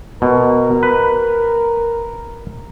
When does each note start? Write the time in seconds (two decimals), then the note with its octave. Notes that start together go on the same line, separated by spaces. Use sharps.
0.22 B2 A#4
0.83 B4